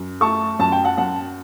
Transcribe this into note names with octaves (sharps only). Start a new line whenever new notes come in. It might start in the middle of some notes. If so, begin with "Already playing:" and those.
Already playing: F#2
A3 A5 C#6
F#2 A5
G5
F#5 A5
F#2 F#5 A5